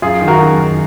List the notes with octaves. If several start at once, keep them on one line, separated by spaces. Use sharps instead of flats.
F#2 F4 G#4
D#3
F#4 A#4
F#2
D#3